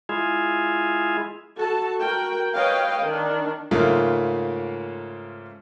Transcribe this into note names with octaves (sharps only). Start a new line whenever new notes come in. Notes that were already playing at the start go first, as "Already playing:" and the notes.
G#3 E4 F4 G#4
F#4 A4 A5
F#4 A#4 G5
B4 C#5 D#5 F5 G5
D#3 D4
G#2 C#3 A3 A#3 F4